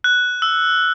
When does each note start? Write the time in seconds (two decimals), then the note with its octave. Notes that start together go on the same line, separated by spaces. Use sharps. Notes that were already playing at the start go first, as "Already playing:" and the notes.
0.04 F#6
0.42 E6